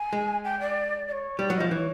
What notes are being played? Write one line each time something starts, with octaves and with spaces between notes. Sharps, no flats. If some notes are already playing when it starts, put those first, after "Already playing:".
Already playing: G#5
G#3
G5
D5
D5
C#5
G3 D5
F#3
F3 D#5
E3 C#5